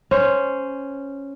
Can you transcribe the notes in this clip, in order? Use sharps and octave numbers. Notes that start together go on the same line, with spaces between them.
C#4 C5